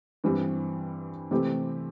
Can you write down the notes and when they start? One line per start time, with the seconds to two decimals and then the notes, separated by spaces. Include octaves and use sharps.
0.24 G2 E3 G3 C4
1.31 C3 E3 A3 C4 G4